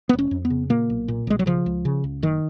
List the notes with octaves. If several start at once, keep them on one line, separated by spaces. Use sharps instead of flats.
B3
F1
C#4
F2
B3
C#3
A#2 A#3
B1
A#2
B1 G#3
F#3
C#3 F3
C#2
C#3
C#2
F#1 D#3